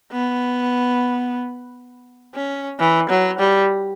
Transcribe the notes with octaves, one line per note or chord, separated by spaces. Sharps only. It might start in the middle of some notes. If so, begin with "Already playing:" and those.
B3
C#4
E3
F#3
G3